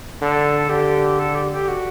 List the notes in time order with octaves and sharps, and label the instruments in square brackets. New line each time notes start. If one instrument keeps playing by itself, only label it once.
[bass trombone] D3 [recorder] A4
[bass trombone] D3 [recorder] G4
[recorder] A4
G4
G4
F#4